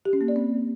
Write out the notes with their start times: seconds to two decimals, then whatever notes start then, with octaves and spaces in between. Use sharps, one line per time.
0.05 G4
0.13 C#4
0.21 A#3
0.28 D5
0.36 C4